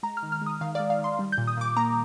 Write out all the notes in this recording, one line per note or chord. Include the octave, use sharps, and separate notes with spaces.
G#3 A#5
F6
D#3
F6
G#3 D#6
D#3 F5
G#3 D5
F5
D#3
C6
G3
G6
A#2
D#6
A#2 D6
A#3 A#5